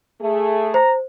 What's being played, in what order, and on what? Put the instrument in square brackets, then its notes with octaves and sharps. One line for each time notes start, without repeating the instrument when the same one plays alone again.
[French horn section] A3 G#4
[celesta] C5 [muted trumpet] A#5